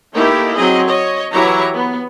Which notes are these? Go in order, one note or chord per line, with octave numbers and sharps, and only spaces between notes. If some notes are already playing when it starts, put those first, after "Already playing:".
A3 A#3 D#4 E4 G4 A#4
F#3 C4 G#4 D#5
C#5 D#5
E3 F#3 E4 G4 C#5 A#5
B3